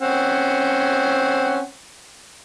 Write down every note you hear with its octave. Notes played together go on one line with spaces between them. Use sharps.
C4 C#4 F#5